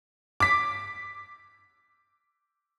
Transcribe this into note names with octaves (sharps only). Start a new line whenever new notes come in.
D6 B6